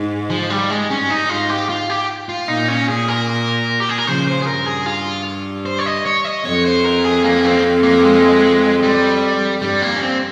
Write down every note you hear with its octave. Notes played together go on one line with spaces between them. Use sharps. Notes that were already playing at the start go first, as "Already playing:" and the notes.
Already playing: G#2
F3
G3
G#3
G2 C#4
D#4
G#2 F4
G4
F4
G4
F4
A#2 D#4
C#4
G#4
A#4
G4
G#4
A#4
C#3 F3 C5
C5
G#4
G2 A#4
G#4
F4
C5
C#5
D#5
C#5
D#5
F2 C#5
C5
A#4
G#4
A#3
C4
A#3
G#3
G3
G2 G3
A#3
C#4
C4